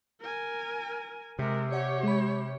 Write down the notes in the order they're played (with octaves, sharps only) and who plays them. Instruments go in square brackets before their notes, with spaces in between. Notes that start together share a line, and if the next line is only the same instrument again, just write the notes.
[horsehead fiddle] A#4 G#5
[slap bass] C3 [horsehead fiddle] G#3 A#4
[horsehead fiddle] G4 C#5 [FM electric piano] D5 F#5
[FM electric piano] G#3 B5